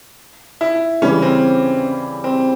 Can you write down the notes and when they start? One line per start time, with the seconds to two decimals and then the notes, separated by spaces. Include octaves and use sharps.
0.61 E4
1.02 C#3 E3 G3 C#4
1.22 C4
2.24 C4